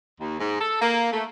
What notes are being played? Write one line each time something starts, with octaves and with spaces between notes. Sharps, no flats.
D#2
G#2
A4
A#3
A3